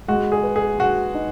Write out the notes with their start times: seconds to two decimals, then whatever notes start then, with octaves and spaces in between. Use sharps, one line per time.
0.08 G#3 F#4
0.32 G#4
0.43 B4
0.56 G#4
0.79 F#4 G#4
1.14 D#4